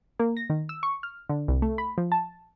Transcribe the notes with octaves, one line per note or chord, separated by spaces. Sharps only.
A#3
A#6
D#3
E6
C#6
F6
D3
C2
A3
B5
F3
A5